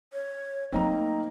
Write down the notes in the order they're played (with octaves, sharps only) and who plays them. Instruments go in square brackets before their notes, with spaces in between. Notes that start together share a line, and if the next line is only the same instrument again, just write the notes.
[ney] C#5
[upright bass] F#3 A3 [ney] A#3 [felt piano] C4 D#4 A#5